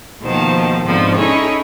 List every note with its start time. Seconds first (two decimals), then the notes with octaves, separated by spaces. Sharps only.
0.21 D#2 B2 D#3 F3 C5 A5
0.85 G#2 B2 D3 F3 C4 D#4
1.15 C#4 D#4 E4 G#4 A4 C#5